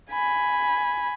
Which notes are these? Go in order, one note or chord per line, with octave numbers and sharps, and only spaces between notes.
G#5 B5